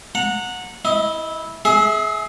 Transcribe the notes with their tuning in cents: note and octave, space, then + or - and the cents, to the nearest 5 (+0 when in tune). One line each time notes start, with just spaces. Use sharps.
F#5 -20 A#5 -25
E4 -15 D#5 +20
G#4 +25 E5 -20